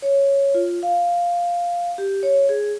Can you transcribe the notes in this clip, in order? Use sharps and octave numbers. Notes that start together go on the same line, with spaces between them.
C#5
F4
F5
G4
C#5
G#4